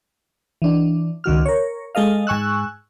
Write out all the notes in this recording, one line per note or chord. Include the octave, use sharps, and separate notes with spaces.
E3 D4
C#2 D#3 F#4 F6
A#4 C#5
G#3 A4 D#5 F5
G#2 G#5 C#6 E6 F#6